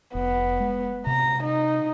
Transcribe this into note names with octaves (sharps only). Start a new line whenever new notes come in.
F1 B3
G#3
C3 A#5
D#4